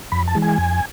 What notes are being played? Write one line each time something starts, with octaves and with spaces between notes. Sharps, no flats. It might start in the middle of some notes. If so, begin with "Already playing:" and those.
F2 B5
A5
E3 G#3
G#5
F2